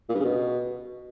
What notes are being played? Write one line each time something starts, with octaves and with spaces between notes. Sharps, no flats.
A#2
G2
C#3
B2